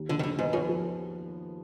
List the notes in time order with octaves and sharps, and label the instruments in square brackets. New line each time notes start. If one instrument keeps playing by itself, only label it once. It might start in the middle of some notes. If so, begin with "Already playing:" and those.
Already playing: [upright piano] D#2
[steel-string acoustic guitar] D3 [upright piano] F3
[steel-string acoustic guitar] D#3
[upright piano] D#2 [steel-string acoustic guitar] D3
[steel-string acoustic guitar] G#2 [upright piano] B3
[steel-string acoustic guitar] F#2 [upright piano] F3
[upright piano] F3